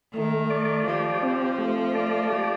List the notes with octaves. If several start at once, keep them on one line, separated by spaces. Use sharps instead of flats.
D#3 A3
D5
F3 G4
C4
A3
D5
G4